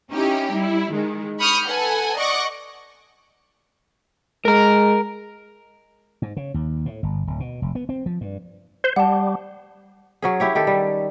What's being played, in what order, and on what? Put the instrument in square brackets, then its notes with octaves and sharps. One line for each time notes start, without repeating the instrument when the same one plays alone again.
[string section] C#4 D#4 E4 G4
G3 E4
D#3 G#3
B5 C#6 D#6 F6 G6
A4 B4 F#5 G#5
D5 D#5 F#5 C#6 D6
[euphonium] G#3 [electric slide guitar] A#4 A#5
[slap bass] G#2
C#3
D#2
A2
G1
D1
B2
F1
B3
C4
F3
G2
[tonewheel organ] C5
[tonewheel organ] G3 [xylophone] F#5 A5
[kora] F#3 C#4 G#4
E4 G4 C#5
D#3 G4 A4
G3